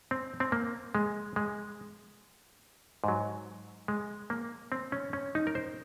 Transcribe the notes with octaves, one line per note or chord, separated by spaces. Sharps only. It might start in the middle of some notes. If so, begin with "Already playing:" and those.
C4
C4
A#3
G#3
G#3
G#2 F#3
G#3
A#3
C4
C#4
C#4
D#4
A#4
C5